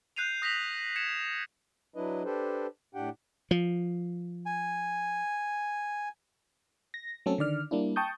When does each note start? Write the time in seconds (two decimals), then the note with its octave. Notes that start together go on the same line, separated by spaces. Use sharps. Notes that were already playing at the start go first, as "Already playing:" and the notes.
0.16 F#6 G6 C7 D#7 F7
0.42 D#6 A#6 B6 F7 F#7
0.96 G#6 C#7 E7
1.95 F#3 D4 E4 B4 D#5
2.24 D4 G4 A4 B4 C5
2.95 A2 D4 G4 F#5 G5
3.51 F3
4.46 G#5
6.94 A#6
7.26 F#3 A3 C4 C#4 A4
7.38 D3 D#3 D5 F6
7.71 G3 A#3 D4 E4
7.96 G5 A5 C#6 D#6 G6